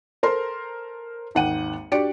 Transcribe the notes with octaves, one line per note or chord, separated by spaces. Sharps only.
A4 A#4 C5 C6
G#1 D#2 F#5 G5 D#7
D4 F#4 G4 D5 C#7 D7